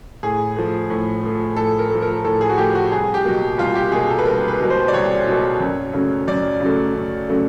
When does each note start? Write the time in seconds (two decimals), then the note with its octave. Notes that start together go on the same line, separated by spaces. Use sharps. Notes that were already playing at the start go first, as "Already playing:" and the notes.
0.23 A2 G#4
0.56 F3 A3
0.90 A2
1.23 F3 A3
1.56 A2 A4
1.79 A#4
1.90 F3 A3
2.02 A#4
2.24 A2 A4
2.41 G#4
2.49 F#4
2.58 F3 A3 G4
2.75 F#4
2.92 C2 G#4
3.14 G4
3.25 B2 F#3 A#3
3.58 C2 F4
3.75 G4
3.92 B2 F#3 A#3 G#4
4.10 A4
4.18 B4
4.25 C2 A#4
4.48 B4
4.60 B2 F#3 A#3
4.70 C5
4.88 D5
4.93 C2 C#5
5.27 B2 F#3 A#3
5.60 F#2
5.93 C#3 F#3 A3
6.28 F#2 D5
6.60 C#3 F#3 A3
6.94 F#2
7.29 C#3 F#3 A3